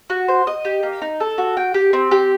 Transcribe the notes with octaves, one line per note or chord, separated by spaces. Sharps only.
F#4
C5
D#5
G4
A#3
D#4
A4
F#4
G5
G4
C4
G4